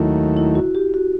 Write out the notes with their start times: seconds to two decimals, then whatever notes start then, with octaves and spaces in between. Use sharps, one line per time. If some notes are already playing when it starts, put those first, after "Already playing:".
Already playing: D#2 D#3 F#3 A3 E4
0.37 E4
0.55 F#4
0.75 G4
0.94 F#4